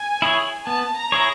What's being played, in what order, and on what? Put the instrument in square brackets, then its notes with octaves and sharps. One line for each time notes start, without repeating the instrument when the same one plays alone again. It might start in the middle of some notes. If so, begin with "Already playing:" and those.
Already playing: [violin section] G#5
[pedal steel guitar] E4 G#4 C#5
[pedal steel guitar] B3 [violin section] A5
[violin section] A#5
[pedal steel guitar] E4 G#4 C#5